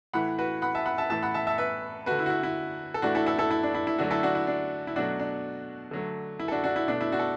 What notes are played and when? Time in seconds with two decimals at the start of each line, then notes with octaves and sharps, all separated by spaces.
0.13 A2 E3 A3 F#5 B5
0.38 F#4 B4
0.62 F#5 B5
0.75 E5 A5
0.86 F#5 B5
0.98 E5 A5
1.10 A2 E3 A3 E5 A5
1.23 F#5 B5
1.34 E5 A5
1.47 E5 A5
1.58 B4 E5
2.06 D3 A3 F#4 B4
2.19 E4
2.26 F#4
2.30 E4
2.43 E4
2.94 A4
3.02 A2 E3 A3 D4 F#4
3.15 E4 A4
3.26 E4 A4
3.38 E4 A4
3.51 E4
3.63 D4
3.74 E4
3.87 E4
3.99 D3 F#3 A3 D4 F#4
4.11 E4 A4
4.23 D4 F#4
4.35 E4
4.47 D4
4.87 E4
4.96 B2 F#3 A3 D4 F#4
5.19 D4
5.91 D3 F#3 A3
6.40 E4
6.48 A4
6.52 D4 F#4
6.64 D4 F#4
6.76 E4
6.88 B2 A3 D4
7.01 E4
7.12 D4 F#4
7.19 A4